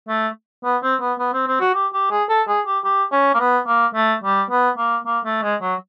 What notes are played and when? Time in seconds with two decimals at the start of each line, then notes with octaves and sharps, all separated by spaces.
0.08 A3
0.64 B3
0.83 C4
1.01 B3
1.19 B3
1.33 C4
1.47 C4
1.60 F#4
1.74 G4
1.93 G4
2.11 G#4
2.29 A4
2.48 G#4
2.66 G4
2.85 G4
3.12 C#4
3.34 A#3
3.40 B3
3.67 A#3
3.95 A3
4.24 G3
4.50 B3
4.78 A#3
5.06 A#3
5.25 A3
5.42 G#3
5.61 F#3